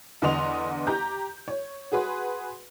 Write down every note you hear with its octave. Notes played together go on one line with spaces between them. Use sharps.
E2 D3 B3 D#5 C6 F7
G4 A#5 G6
C#5
F#4 G#4 B4 C6